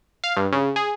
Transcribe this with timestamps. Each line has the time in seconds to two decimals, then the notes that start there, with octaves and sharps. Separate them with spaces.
0.24 F5
0.36 G2
0.52 C#3
0.76 G#4